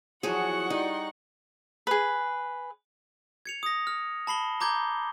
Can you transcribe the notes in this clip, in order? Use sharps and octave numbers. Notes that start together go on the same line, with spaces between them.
E2 F3 F#3 F#4 G#4 F#5 C#6
G3 D#4
G#4 B4
G#6 C#7 F7
D#6 A#6
F6
A5 B5 C7 G7
A#5 D6 G6 G#6 G7